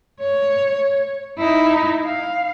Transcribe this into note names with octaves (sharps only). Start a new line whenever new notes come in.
C#5
D#4 E4
F5